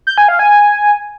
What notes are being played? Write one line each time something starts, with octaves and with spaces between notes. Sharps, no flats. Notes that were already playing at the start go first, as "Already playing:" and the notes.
G6
G#5
F5
G#5